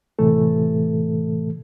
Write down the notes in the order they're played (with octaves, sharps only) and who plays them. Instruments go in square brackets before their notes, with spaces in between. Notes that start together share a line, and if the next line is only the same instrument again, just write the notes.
[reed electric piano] A2 C3 E3 A3 A4